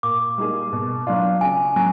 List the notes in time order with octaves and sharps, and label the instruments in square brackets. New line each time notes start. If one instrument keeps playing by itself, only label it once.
[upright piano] A#2 [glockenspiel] D6
[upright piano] G3 A#3 D#4 G#4
B2
F#3 B3 D4 F4
[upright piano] C#3 [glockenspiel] G#5
[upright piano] F#3 [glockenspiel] G#5